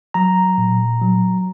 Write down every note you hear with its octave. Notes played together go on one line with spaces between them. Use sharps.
F#3 A#5
A#2
F#3